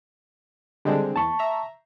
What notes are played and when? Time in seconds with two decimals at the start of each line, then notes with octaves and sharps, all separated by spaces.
0.85 D3 G3 G#3 C4 D4
1.16 E2 A5 C#6
1.39 E5 A#5